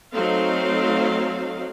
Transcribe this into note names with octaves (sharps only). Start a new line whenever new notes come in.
F#3 A3 C4 D#4 F5